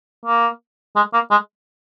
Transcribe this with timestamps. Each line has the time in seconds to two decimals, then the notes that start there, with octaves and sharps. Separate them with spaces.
0.26 A#3
0.96 G#3
1.13 A#3
1.31 G#3